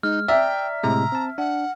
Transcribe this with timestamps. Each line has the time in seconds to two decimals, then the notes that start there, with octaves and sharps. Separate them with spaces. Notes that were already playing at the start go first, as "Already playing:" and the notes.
0.03 G#3 D#4 F6
0.28 D5 E5 G5 A#5
0.83 A2 C3 G#3 A#5
1.12 C4 A5
1.38 D4 F#5